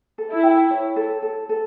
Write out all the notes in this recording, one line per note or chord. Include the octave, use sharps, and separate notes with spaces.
A4
E4
G5
C#5
A4
A4
A4